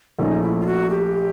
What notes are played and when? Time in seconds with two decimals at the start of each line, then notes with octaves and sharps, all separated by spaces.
0.19 A#1 A#2 F3 A3 C#4 D#4
0.42 E4
0.60 F4
0.66 F#4
0.90 G4